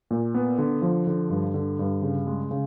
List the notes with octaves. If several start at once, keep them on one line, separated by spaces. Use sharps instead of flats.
A#2
B3
D3
F3
D3
G2
D3
G2
C#3
G#3
C#3